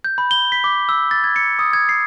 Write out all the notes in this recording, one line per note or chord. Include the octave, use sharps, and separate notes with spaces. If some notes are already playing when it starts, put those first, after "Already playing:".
G6
B5
G7
B6
D6
E6
A6
G#6
C#7
D#6
G#6
C7